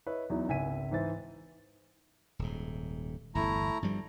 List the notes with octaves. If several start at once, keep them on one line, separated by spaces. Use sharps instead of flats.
E4 B4 C#5 D#5 E5
E2 F#3 D#4 E4
G#1 C#2 E5 G#5 B6 D#7
G#2 E3 C5 A6
D#1 G#2
G1 E2 A3 E4 A#5
G2 F3 G3